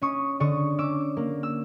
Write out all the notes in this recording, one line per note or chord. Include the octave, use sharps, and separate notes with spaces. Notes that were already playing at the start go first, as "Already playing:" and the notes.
C#4 C#6 D#6
D3 C#6 D#6
C#4 D6 E6
A#3
E6